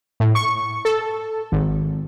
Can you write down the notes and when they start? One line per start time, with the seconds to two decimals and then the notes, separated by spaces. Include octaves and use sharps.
0.20 A2
0.35 C#6
0.85 A4
1.52 G#1